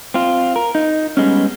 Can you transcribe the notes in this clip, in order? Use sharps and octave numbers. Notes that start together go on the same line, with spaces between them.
C4 F4
A#4
D#4
G3 G#3 B3 C#4